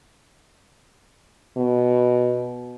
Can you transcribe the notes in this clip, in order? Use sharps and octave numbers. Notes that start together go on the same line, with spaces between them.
B2